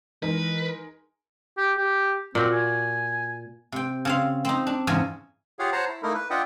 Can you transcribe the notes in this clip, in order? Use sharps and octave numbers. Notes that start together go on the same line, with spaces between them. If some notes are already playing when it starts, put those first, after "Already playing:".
E3 G#3 D#4 A#4 B4
G4
G4
A#2 C4 F#4
G#5
C3 G5
C#3 C4 F5
C4 D#4
D4
E2 G#2 C#3 G#5
F4 G4 G#4 C#5 F5 F#5
C5 C#5 F#5 A5 A#5 C6
E4
A3 A#3 D#4 E4 A#4
B4
D4 F4 D#5 E5 F#5 G5